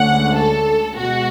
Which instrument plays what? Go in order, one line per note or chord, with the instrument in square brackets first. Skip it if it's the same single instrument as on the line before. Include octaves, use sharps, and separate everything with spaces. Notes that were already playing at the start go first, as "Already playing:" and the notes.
Already playing: [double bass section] D2 D3 G#3 C#4 [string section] F#5
[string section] A4
[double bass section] B2 G#3 [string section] F#4